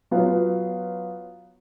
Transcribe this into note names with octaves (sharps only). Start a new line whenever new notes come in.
F#3 B3 F4 F5